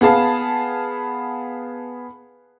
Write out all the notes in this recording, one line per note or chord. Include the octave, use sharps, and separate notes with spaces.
B3 G#4 F5 A5